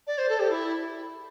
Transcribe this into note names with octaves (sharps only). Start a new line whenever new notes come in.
D5
C5
A4
G4
E4